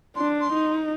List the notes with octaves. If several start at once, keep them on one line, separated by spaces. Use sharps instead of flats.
D4 C6
C6
D#4